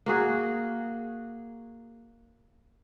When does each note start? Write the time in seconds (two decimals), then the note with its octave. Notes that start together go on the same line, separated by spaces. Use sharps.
0.06 A#3 F#4 G#4